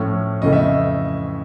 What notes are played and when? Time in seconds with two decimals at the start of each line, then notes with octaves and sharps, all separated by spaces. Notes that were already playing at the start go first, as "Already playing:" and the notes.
Already playing: A2 F3 A3 C#4
0.41 F2 C#3 E3 A3 D#5
0.53 E5